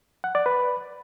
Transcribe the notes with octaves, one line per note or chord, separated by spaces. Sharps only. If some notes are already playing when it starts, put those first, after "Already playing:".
F#5
D5
B4